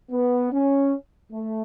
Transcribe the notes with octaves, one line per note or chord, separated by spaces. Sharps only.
B3
C#4
A3